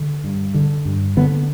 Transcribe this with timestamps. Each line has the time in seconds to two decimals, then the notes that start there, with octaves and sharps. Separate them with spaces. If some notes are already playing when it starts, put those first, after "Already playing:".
Already playing: D3
0.24 G2
0.54 D3
0.85 G2
1.17 D3 B3